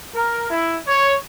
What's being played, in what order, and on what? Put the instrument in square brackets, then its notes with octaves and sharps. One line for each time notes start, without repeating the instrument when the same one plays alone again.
[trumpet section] A#4
E4
C#5